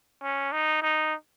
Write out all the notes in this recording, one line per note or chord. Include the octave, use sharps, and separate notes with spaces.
C#4
D#4
D#4